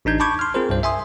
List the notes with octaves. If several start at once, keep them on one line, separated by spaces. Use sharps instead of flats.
A1 D4 D#4 G6 G#6
A5 B5 C#6 D6 G6 G#6
C6 F6
C4 F4 G#4 A#4 C5
C2 G2 C5
E5 G#5 C6 D#6